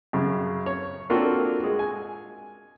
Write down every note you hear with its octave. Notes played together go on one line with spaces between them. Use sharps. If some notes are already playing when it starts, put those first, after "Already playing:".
F#2 C#3
C#5
A#3 C4 D4 F4 F#4 A4
G#3
G#5